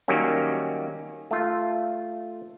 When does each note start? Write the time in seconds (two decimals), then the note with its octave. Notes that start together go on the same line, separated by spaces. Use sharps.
0.08 D#3 F#3 G3 A#3 C#4
1.31 A3 F4